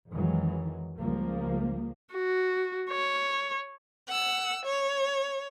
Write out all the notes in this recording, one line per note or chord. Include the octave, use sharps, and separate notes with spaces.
F2 D#3 E3 F#3 G#3
C#2 F3 G3 A#3
F#4
C#5
F#5 E6
C#5